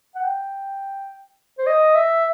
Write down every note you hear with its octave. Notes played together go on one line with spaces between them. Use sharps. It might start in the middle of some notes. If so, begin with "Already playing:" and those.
F#5
G5
C5
D#5
E5